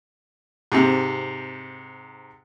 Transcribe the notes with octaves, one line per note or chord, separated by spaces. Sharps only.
G#2 C3